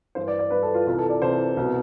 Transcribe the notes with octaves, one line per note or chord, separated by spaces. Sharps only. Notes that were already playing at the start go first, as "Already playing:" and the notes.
G2 E3 C5
D5
D5
G2 E3 B4
A4
F4
C2 C3 E3 F4
A4
D5
C2 C3 E3 C5
C2 B2